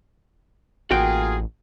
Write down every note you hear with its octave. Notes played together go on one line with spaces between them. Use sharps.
A1 A#3 F4 F#4 G#4 G5